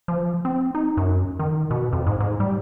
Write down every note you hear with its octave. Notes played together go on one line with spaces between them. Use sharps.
F3
C4
D#4
F#2
D#3
B2
F2
G#2
G#2
G3